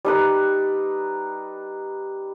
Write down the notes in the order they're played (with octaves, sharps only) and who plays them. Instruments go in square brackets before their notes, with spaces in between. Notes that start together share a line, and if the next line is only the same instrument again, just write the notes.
[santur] G3 D#4 B4